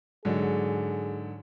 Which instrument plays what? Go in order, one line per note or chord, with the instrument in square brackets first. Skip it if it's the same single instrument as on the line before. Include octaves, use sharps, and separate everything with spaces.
[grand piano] G#2 D3 F#3 [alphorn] G#4